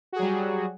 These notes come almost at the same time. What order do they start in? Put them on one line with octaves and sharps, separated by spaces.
F#4 G#4 F#3 G3